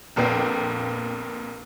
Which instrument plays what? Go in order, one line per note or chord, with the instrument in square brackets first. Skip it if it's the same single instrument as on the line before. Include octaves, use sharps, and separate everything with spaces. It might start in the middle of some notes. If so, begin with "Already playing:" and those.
[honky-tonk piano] A#1 F2 A#2 B3 G5 C7